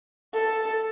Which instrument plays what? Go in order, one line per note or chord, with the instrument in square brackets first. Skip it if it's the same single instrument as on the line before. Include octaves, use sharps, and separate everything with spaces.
[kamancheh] A4